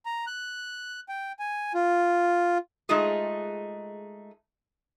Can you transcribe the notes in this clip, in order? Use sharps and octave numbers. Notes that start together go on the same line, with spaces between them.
A#5
F#6
G5
G#5
F4
G#3 A3 D#4 F4 G#4